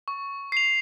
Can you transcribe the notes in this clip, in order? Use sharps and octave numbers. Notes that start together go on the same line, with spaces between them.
C#6
C7 F7